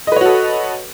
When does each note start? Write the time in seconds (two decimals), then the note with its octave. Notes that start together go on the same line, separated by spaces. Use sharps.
0.07 D#5
0.12 B4
0.16 C#5
0.21 F#4
0.26 A4